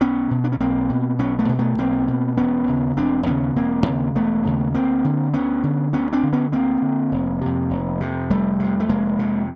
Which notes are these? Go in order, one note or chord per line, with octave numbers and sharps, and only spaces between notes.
B1 B3 C#4
B2
D4
C#4
B1 A#3 C4
B2
B1 B3 C#4
A3 B3
B2
A3 B3
B1 A#3 C4
B2
E1 B3 C#4
D#2 C#3
E1 C4 D4
D#2 C#3 B3 C#4
E1 A#3 C4
D#2 C#3
E1 A3 B3
D#2 C#3
D2 A#3 C4
D3
D2 B3 C#4
D3
D2 B3 C#4
C4 D4
D3
B3 C#4
D2 A#3 C4
D3
F1
F2 C3
F1
F2 C3
F1 G3 A3
F2 C3
A3
F1 G#3 A#3
F2 C3